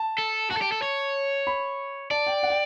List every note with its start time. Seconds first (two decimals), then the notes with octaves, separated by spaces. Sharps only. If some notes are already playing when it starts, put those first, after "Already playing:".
Already playing: A5
0.18 A4
0.51 F#4 A5
0.57 A4
0.62 G4
0.72 A4
0.82 C#5
1.47 B5
2.11 D5 A5
2.27 G5
2.43 F#5
2.50 G5